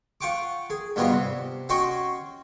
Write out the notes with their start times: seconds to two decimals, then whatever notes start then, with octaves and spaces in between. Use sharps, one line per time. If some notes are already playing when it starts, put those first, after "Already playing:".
0.21 F4 F#5 G5 C#6 D6
0.70 G#4
0.96 G2 B2 G3 B3 F4
1.12 C3
1.69 C#4 F#4 D#5 G5 C6 C#6